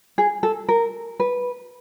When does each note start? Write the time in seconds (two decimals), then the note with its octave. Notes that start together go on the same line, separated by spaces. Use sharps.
0.18 G#4
0.43 A4
0.69 A#4
1.20 B4